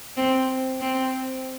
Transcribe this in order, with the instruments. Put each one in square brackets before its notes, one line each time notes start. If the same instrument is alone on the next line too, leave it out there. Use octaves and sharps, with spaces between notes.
[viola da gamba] C4
C4